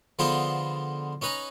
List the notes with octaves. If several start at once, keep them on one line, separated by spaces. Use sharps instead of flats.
D3 F3 B3 D#4 G#4 C5
C#4 D#4 B4 G#5 A#5